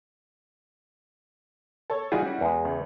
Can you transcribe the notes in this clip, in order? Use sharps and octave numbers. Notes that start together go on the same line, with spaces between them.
A4 C#5
E3 G3 D#4 F4 F#4 G#4
C#4
E2 G#3
C#2